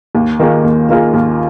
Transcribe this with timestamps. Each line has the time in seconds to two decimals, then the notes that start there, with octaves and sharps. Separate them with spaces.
0.15 D#2
0.39 D#3 A#3 F4 G#4
0.64 D#2
0.89 D#3 A#3 F4 G#4
1.14 D#2